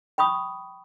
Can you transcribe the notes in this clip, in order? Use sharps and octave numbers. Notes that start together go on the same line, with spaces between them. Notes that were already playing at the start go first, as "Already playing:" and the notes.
G5 B5 C#6 D#6